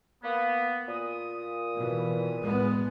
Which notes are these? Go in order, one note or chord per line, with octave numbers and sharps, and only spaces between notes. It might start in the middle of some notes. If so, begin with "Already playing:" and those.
A#3 B3
A#2 D#6
B2 E3
A2 G#3 B3